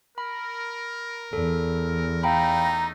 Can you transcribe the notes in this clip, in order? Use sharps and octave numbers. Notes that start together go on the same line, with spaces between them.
A#4 B5
E2 A4
A3 D#4 F5 G5 A#5 B5